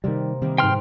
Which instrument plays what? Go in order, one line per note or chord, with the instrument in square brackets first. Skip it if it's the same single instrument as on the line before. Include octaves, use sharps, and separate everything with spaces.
[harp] C3 A#3 [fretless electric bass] D#3 G3
[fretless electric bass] C3 [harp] D#3 G3 A#3
[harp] G#2 B4 [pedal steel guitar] G5 C6 F6